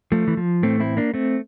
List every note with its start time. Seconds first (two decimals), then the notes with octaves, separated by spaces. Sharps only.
0.12 F3 A3
0.28 E3
0.37 F3
0.63 A2 E3 A3 C4
0.80 C4 E4
0.97 A#3 D4
1.14 A3 C4